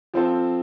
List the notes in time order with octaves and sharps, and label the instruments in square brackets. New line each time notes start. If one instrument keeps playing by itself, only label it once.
[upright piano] F3 C4 F4 A4 C5